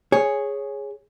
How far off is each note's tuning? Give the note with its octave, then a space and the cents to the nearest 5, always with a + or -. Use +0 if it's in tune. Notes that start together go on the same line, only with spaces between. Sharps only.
G#4 +0 C#5 +0